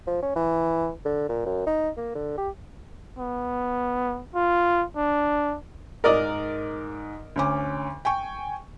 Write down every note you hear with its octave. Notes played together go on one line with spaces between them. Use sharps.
F3
C#4
E3
D3
A#2
F#2
D#4
A#3
D3
G4
B3
F4
D4
G#2 A#4 D5 D#5
D2 C#4 D6
G5 G#5 C#6